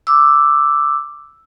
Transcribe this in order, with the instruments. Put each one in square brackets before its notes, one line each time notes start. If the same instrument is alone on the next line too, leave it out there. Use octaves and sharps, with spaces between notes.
[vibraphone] D6 E6